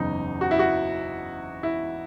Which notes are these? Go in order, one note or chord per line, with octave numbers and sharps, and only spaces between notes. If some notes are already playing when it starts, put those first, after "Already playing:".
Already playing: F#1 E2 C#3 D#4
F#4
E4
F#4
E4